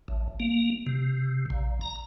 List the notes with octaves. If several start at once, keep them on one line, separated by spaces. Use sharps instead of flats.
A1
A#3
C3
A#1
A#5